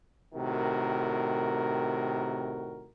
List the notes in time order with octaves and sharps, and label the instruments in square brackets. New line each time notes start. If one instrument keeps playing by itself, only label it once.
[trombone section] A2 C3 D#3 F#4 A#4